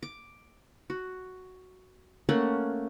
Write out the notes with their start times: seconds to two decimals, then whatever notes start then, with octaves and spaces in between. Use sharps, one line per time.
0.03 D6
0.90 F#4
2.29 A3 A#3 C#4 F#5